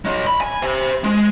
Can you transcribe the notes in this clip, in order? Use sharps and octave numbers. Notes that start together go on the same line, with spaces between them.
F#3 D#5
B5
G#5
C5 E5
G#3